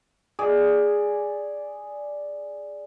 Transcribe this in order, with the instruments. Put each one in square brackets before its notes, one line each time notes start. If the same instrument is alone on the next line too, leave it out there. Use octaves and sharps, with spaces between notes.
[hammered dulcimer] G#4 D5